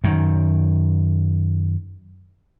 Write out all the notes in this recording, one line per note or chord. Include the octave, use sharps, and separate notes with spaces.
F#2 D#3